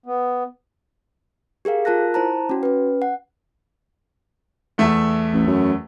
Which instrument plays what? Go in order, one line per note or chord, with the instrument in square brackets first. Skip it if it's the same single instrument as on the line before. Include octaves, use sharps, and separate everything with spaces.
[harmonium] B3
[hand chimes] G4 G#4 A#4 F5
F4 A#4 A5 F#6 A#6
E4 C5 A5 A#5
C#4 F#4
C#4 B4
F#5
[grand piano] E2 A3 E5
[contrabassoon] A1
F#2